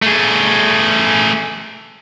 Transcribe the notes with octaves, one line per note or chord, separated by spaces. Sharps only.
A3 G#4